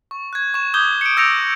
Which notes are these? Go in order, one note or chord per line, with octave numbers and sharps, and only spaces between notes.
C#6
F#6 G#6
C#6 E7
D6 D#6 G6 G#6 G7
C#7 D7
E6 G6 A#6 C#7 D7 F7